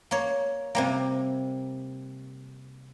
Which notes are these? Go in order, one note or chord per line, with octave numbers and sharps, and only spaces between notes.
A#3 C#5
C3 G3 A#3